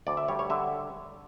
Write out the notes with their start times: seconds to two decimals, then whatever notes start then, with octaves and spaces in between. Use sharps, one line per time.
0.07 D2 D5
0.17 E5
0.28 G3 C#5
0.39 C#5
0.50 D3 E5